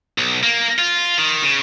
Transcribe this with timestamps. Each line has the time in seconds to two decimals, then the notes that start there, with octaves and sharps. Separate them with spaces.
0.18 B1
0.43 A#3
0.78 F4
1.18 D#3
1.43 C#3